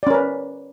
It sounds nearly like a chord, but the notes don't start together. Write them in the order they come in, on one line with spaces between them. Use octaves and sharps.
D5 C#4 A#4 B4